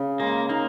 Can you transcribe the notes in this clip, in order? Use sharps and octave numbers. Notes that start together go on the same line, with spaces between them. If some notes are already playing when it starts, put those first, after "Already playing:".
Already playing: C#3 G#4
G#3 A#3
A#3 D#4